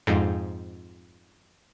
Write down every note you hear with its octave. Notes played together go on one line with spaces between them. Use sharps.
F2 G#2